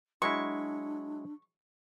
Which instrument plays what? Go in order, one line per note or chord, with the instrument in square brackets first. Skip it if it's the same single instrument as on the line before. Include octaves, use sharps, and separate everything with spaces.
[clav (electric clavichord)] F#3 G#3 E4 [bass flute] D4 [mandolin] C#6